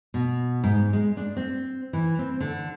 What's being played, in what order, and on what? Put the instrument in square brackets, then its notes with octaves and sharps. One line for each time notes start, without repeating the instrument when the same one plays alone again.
[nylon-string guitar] B2
G#2
G#3
D4
C4
E3
C4
D3